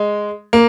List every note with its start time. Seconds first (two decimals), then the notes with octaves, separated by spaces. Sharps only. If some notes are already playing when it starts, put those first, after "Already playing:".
Already playing: G#3
0.53 A#3